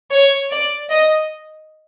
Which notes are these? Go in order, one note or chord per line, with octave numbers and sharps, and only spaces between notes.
C#5
D5
D#5